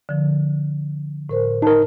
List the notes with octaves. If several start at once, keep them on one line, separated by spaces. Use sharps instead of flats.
D3 F3
A2 A#4 C5
D#4 A#4 A5